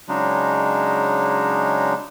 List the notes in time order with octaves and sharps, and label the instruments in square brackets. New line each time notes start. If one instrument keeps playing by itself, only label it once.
[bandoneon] C#3 F#3 G#3 D4 D#4